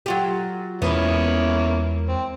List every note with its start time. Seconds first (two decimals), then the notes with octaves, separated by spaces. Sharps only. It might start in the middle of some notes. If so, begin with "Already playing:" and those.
0.06 F#3 F4 G4
0.82 E2 G#3 A#3 B3 C#4 E4
2.09 C4